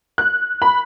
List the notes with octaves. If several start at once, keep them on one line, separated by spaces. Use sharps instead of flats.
F#6
B5